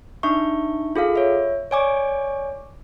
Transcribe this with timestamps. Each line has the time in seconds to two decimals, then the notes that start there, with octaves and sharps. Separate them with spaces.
0.23 D4 D#4 E5 C#6
0.96 F4 G#4 A4 F5
1.16 C#5 E5
1.71 C#5 D5 G#5 C#6 D6